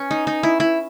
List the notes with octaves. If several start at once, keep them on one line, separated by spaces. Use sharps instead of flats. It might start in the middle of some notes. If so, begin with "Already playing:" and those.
Already playing: C#4
D#4
D#4
E4
E4